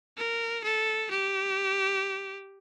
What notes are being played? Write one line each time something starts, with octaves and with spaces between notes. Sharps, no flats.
A#4
A4
G4